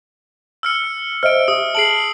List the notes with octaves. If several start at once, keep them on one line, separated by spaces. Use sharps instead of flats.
E6 F6 C#7
C5 D#5 E5 F6 D7
G4 E5 D#6
G#4 A5 C7 D7 F#7